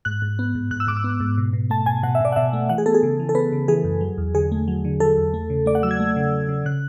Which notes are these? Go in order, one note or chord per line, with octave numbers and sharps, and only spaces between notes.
G#2 F#6
G#2
B3
G#2
G#2 F#6
E6
G#2 D6
E6
B3
G#2
B2
B2
A3 A5
B2 G#5
B2 F#5
E5
B2 D5
F#5
B2 E5
A3
E3 F#5
G#4
B3 A4
G#4
C#3
E3
A4
B3 B4
C#3
E3 G#4
F#2
F#3
E2
D3 G#4
A3
F#3
D3
F#3 A4
E2
A3
C#3
A3 D5
F#5
F#3 E6
G#6
A3
C#3
F#3
C#3
C#3 F#6